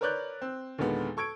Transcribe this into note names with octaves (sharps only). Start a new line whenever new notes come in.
A#4 B4 C#5 D5 F#6 G6
C4
D#2 A#2 D3 G#3 B3
A4 C#6 G#6 D7